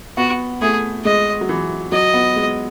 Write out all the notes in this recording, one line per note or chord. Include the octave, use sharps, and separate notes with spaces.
B3 F#4
A3 G#4
G#3 D#5
F#3
E3
F#3 D#5
B3
G#3